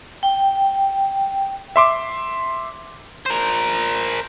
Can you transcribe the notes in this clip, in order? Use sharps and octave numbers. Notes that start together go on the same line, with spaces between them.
G5
E5 C6 D6
A#4 C5